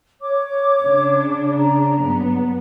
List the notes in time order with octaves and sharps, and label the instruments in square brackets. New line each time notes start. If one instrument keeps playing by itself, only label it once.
[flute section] C#5 D6
[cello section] C#3 D4
[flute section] A#5
[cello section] G2 F#3 B3